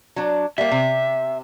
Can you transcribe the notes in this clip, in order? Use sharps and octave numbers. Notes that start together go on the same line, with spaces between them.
F#3 D4
G3 A#3 E5
C3